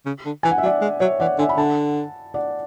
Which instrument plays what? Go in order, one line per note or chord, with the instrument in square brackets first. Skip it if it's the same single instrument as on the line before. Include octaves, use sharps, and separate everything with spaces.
[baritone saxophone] C#3
D3
[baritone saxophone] E3 [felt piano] G#5
[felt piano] F#5
E5
[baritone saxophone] F#3 [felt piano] D5 F#5
[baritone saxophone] G#3
[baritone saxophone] F#3 [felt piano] C#5 E5
[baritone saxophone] E3 [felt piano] D5 F#5
[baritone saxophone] D3 [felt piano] E5 G#5
[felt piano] B5
[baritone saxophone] D3 [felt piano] F#5 A5
[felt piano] D5 F#5